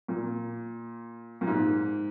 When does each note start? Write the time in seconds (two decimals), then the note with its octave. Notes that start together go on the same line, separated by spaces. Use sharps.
0.08 A#2
1.41 A#2
1.47 G#2